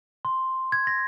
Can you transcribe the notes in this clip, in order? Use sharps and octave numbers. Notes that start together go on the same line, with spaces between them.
C6
G#6
A#6